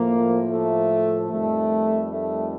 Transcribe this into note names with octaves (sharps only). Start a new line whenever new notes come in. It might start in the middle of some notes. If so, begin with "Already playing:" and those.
Already playing: A2 F3 A#3
A3
F2 D#3 G3 A3
A3